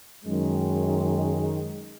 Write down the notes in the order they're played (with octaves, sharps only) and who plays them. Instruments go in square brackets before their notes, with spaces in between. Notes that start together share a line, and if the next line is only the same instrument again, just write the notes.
[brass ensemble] F#2 D#3 G#3